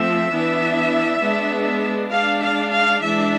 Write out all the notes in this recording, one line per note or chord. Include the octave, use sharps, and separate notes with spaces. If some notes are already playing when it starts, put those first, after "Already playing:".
Already playing: F3 A3 C4 E5
E3 B3 D4
G#3 B3 D4
G#3 D4 F5
F5
F5
E3 G#3 D4 E5